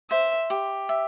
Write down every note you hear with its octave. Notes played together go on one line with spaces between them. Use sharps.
C5 E5
G4
E5